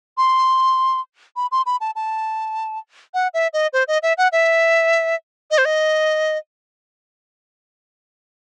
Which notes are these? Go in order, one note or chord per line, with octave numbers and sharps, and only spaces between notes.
C6
B5
C6
B5
A5
A5
F#5
E5
D#5
C5
D#5
E5
F#5
E5
D#5
C5
D#5